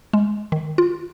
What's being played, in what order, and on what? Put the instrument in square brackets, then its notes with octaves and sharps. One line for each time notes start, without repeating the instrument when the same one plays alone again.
[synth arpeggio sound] G#3
D#3
F4